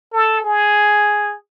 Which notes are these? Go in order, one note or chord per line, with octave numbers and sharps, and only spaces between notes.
A4
G#4